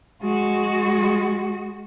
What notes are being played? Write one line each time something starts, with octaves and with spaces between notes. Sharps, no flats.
G#3 F#4